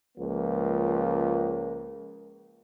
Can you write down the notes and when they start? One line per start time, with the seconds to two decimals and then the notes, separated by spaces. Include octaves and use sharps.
0.18 C#2 F3 A#3